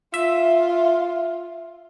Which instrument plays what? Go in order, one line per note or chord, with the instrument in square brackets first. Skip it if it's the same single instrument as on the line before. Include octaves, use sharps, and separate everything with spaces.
[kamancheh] F4 [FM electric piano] E5